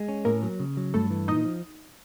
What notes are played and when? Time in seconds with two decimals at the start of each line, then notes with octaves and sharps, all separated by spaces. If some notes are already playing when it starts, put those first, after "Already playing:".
Already playing: G#3
0.08 C#4
0.25 A2 A#3 A#4
0.43 F#3
0.60 C#3
0.77 F#3
0.94 G2 A3 A4
1.11 E3
1.28 A#2 D#4 D#5
1.45 F3